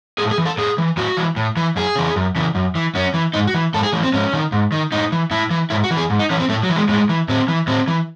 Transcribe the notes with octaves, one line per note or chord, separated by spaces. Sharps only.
A2 G#4
G#4
E3
A4
A2 G#4
E3
A2 F#4
E3
A2
E3
F#2 G#4
C#3 E3
F#2
C#3 E3
F#2
E3
F#2 C#4
E3
G#2 D#4
F#4
E3
G#2 A4
G#4
E3 A3
C4
G#2 C#4
D#3
G#2
D#3
A2 D#4
E3
A2 E4
E3
G#2 E4
F#4
E3
G#4
G#2
D#4
E3 C#4
C4
A2 A3
F#3
E3
G#3
A2 G#3
E3
A2 C4
E3
A2 C4
E3